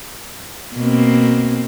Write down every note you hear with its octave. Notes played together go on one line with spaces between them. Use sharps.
B2 A#3 C4